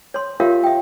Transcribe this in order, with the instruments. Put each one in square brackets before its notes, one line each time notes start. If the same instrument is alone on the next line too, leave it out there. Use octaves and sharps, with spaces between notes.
[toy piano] C#5 C6
F4 G4 A#4 C#5 E5 F5
E5 G5